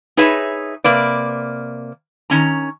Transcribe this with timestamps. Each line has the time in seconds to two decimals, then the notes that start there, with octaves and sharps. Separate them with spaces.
0.17 D#4 G#4 B4 C#5 E5
0.84 C3 A#3 B4 D5
2.30 D#3 C#4 A#5